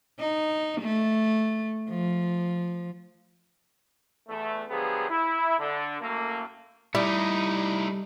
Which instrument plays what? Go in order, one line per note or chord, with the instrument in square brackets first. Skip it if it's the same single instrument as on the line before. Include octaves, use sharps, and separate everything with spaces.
[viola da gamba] D#4
A3
F3
[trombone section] E2 A3
D3 F3 F#3 B3 G4 G#4
E4
D3
F#2 A2 A3 A#3
[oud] G3 [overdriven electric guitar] A3 D#4 [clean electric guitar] E4